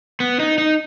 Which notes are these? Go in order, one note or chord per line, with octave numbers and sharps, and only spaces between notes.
B3
D#4
D#4